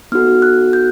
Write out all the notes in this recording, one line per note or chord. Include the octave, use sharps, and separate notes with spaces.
B3 D#4 F#4 A4 F6
F#6
G6